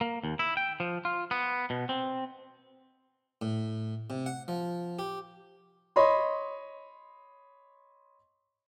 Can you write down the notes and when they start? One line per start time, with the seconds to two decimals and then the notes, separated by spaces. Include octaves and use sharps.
0.01 A#3
0.24 D#2
0.39 E4
0.57 G5
0.80 F3
1.05 F4
1.31 B3
1.70 B2
1.89 C4
3.42 A2
4.10 C3
4.26 F#5
4.48 F3
4.99 G4
5.96 C#5 D#5 B5 C6